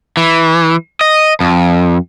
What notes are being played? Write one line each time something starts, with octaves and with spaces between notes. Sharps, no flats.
E3
D#5
F2